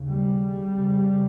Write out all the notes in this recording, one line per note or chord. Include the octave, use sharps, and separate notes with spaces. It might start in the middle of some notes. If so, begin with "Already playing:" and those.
Already playing: D#2 C#3
G3
F2 C#3